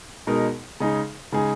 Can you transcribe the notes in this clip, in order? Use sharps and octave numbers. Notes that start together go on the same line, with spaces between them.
B2 G#3 D#4 A#4
C#3 G#3 D#4 G#4
C#3 G#3 D#4 G#4